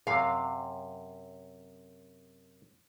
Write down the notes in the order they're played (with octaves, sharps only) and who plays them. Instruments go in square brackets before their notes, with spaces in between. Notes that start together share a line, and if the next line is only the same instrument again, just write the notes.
[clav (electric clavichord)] F#2 C3 [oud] F5